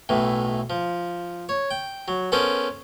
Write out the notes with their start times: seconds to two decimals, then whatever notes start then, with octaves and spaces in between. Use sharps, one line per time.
0.09 B1 A2 E3
0.70 F3
1.49 C#5
1.71 G5
2.08 F#3
2.32 B3 C#4 A4 A#4 C5